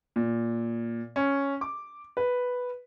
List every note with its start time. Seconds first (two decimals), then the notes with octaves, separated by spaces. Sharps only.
0.16 A#2
1.16 C#4
1.61 D6
2.17 B4